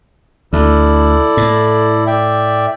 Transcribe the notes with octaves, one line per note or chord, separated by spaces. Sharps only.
D2 E4 A4 D5
A2
D5 E5 G5